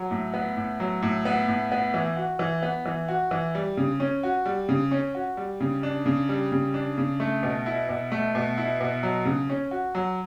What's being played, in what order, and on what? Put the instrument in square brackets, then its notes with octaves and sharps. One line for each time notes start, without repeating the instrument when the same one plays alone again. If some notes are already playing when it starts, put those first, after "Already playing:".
Already playing: [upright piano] F#3
A2
B3
A2
F#3
A2
B3
A2
B3
E3
F#4
E3
B3
E3
F#4
E3
G3
C#3
C#4
F#4
G3
C#3
C#4
F#4
G3
C#3
D4
C#3
G3
C#3
D4
C#3
A3
B2
E4
B2
A3
B2
E4
B2
F#3
C#3
C#4
F#4
F#3